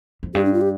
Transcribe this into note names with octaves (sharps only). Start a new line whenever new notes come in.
F2
G2 G4
D4
F4
G4